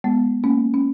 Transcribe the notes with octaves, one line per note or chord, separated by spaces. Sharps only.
G#3 B3
A#3 C#4
C#4